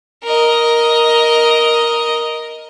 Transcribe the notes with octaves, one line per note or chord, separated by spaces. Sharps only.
A#4 D#5